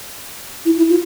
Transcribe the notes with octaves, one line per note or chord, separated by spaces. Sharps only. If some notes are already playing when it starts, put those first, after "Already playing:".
E4
E4
F4